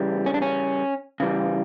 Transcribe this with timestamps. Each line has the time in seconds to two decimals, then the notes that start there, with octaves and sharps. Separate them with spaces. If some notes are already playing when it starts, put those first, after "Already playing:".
Already playing: C#3 E3 G3
0.26 C#4
0.34 D4
0.42 C#4
1.20 C#3 E3 G3